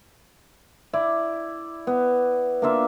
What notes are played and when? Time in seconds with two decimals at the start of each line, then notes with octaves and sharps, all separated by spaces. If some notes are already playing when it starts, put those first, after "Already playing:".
0.93 E4 D5
1.87 B3
2.62 A#3 D4 F4 E5